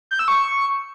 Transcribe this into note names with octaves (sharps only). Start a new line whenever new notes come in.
G6
E6
C#6